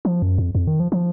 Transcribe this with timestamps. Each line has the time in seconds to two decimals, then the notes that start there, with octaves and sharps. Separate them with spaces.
0.05 F3
0.22 F#2
0.38 F2
0.55 F2
0.67 D#3
0.80 F3
0.92 F3